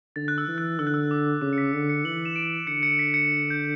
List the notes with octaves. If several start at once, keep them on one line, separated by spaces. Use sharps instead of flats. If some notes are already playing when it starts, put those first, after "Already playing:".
D3 A6
F#6
E6
E3
F#6
D3 E6
F#6
E6
D6
C#3 D6
C#7
B6
D3 C#7
C#7
E3 F#7
E7
D7
D3 C#7
C#7
B6
C#7
G6